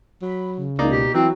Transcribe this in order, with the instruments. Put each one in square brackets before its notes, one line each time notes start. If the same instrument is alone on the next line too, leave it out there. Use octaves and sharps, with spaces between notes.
[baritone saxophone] F#3 [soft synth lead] B5
[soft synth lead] C#3
[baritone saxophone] C#2 [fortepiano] A#3 D#4 D5
[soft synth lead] B2 [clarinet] G4
[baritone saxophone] E3 [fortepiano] F#3 [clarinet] C4 [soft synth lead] E4